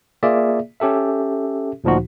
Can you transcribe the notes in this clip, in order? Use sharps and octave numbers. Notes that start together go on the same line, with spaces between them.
A#3 F4 G#4 D5 E5
C#4 G4 A4 E5
D2 A#2 F3 D#4 F#4